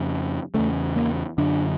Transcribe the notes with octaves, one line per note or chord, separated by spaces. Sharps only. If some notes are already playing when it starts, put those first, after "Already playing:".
Already playing: F2 C#3
E2 C#3 A3
A#3
F#2 D3 D4